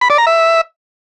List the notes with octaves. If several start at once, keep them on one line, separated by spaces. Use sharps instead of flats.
B5
D5
A#5
E5